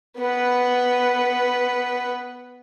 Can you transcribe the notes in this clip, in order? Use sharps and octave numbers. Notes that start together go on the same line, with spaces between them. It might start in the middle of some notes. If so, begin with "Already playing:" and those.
B3 B4